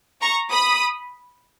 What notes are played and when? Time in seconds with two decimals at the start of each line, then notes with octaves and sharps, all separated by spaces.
0.21 A#5 C#6
0.51 B5 D#6